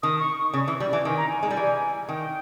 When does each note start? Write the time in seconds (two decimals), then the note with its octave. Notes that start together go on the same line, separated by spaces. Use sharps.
0.03 D#3 D#6
0.20 C#6
0.54 C#3
0.68 E3
0.80 G3
0.93 E3
1.05 D#3 G#5
1.17 A#5
1.29 G#5
1.43 G#3
1.51 G3
1.57 E3
2.08 D#3 G5